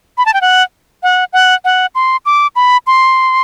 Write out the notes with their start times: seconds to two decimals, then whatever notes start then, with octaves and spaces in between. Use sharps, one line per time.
0.18 B5
0.26 A5
0.34 G5
0.41 F#5
1.03 F#5
1.33 F#5
1.65 F#5
1.95 C6
2.26 D6
2.56 B5
2.87 C6